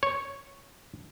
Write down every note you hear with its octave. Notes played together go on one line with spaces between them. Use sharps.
C#5